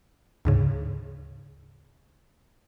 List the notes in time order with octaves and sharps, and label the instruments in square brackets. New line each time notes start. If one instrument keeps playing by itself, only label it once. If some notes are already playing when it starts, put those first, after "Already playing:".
[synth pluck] D2 G#2 C#3